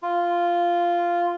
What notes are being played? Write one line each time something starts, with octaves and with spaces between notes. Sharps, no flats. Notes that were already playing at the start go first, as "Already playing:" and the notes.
F4